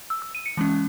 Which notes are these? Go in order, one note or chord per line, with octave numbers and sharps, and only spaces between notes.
E6
E6
D#7
C#7
E3 G#3 C#4